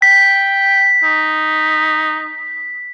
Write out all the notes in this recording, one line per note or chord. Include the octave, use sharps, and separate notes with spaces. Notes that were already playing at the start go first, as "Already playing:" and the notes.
G5 B6
D#4